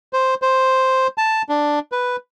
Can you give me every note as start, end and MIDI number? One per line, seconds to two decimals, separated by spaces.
0.13 0.34 72
0.42 1.07 72
1.18 1.42 81
1.49 1.79 62
1.92 2.16 71